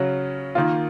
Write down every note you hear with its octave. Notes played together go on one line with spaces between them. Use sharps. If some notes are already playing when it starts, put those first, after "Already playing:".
Already playing: C#3 F#3 C#4
D#3 A#3 F4